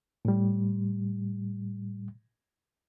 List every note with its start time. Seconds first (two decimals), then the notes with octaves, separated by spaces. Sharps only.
0.25 A2 G3